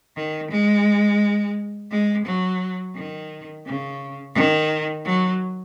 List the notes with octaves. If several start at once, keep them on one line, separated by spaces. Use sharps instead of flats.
D#3
G#3
G#3
F#3
D#3
C#3
D#3
F#3